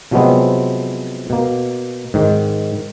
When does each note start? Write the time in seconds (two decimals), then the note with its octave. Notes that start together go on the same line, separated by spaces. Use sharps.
0.11 C3 F3 F#3 G#3 B3 C4
1.30 B2 A#3
2.14 G#2 D#3